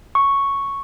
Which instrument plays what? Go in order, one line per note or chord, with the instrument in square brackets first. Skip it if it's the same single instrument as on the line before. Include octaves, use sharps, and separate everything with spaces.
[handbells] C#6